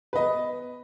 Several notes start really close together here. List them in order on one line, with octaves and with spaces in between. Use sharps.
B4 D#5 B3